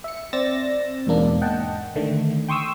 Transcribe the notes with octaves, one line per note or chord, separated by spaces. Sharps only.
E5 C#7
C4 C5 D5 E6 A6 A#6
E2 G#2 B2 A#3 D4
D#5 F#5 G5 A5
D3 D#3 A3
G5 C6 C#6 D#6 E6